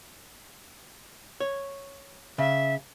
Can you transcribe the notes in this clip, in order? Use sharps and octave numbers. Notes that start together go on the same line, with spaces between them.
C#5
C#3 E5